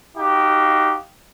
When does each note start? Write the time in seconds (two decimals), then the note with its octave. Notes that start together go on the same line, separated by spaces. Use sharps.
0.17 D#4 F#4 G4 F5